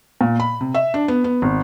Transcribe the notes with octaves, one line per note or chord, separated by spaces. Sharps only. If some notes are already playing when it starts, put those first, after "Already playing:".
A#2
B5
C3
E5
D4
B3
B3
G#1